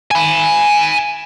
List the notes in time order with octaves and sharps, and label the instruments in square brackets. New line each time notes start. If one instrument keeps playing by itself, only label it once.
[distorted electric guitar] G#5 B5